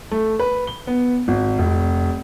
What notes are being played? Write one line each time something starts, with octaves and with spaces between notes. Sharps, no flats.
A3
B4
G7
B3
G#1
F1